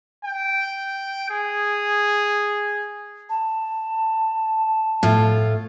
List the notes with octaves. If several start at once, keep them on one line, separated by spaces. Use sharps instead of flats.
G5
G#4
A5
A2 F4